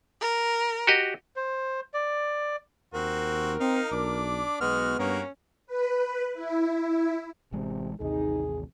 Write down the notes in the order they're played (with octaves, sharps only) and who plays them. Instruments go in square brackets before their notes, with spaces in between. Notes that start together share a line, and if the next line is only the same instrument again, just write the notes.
[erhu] A#4
[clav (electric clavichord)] F#4 G4 D#5
[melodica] C5
D5
[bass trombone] D#2 [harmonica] C4 F#4 [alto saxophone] A#4
[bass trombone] C4 [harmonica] D#4 F5
[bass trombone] B1 [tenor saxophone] D4 [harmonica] D6
[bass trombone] B1 [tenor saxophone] G#3 [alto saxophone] B3 [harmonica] F#4 F6
[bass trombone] G2 [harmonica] A#3 F#4 A#4 [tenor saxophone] C#4
[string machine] B4
E4
E4
[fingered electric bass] A1 E3 G#3 [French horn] C3
[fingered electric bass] A1 D#2 C3 [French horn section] D#4 [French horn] G#4